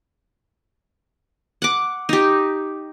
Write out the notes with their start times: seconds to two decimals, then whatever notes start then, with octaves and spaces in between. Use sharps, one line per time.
1.62 F#5 D6
2.09 D#4 G4